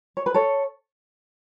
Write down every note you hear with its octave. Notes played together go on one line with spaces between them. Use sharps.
C#5
B4
A4 C#5